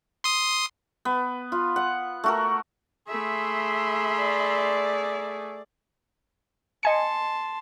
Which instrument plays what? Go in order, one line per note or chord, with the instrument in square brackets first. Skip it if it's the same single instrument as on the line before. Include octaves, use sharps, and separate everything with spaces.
[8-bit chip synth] C6 D#6
[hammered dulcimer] B3
F4
F#5
A3 F#4 A#4
[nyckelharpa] A3 G#4 [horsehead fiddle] E5 B5 [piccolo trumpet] C6
[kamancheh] D5
[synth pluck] D#5 G#5 C#7 [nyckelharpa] A5 C6